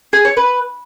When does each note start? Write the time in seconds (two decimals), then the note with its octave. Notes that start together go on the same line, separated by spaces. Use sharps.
0.13 G#4
0.25 C#5
0.37 B4